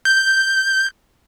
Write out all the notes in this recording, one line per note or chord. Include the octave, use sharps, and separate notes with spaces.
G6